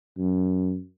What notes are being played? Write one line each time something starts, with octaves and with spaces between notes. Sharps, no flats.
F#2